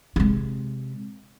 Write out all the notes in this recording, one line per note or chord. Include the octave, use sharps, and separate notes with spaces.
C3 G#3